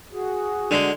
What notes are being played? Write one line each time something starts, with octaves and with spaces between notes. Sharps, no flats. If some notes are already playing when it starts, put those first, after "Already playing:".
F#4 G#4
D3 G#3